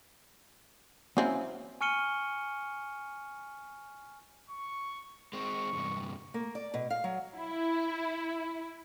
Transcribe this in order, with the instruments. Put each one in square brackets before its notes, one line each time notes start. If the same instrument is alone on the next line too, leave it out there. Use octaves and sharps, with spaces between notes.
[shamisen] F#3 C4 E4 [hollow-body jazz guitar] A#3 C#4 G#5
[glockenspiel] G#5 C#6 F6 C#7 D#7 G7
[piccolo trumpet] C#6
[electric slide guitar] G#3 C4 [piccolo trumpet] C#6
[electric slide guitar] E2 G2 C3
[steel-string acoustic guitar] A#3
D5
B2
F5
F#3
[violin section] E4